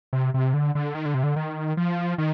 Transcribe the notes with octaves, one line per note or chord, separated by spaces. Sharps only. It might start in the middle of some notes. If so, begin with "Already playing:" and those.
C3
C3
D3
D3
D#3
D3
C3
D3
D#3
F3
D#3